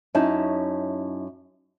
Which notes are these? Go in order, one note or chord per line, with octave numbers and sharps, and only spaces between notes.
F#2 C#4 D#4 E4 A5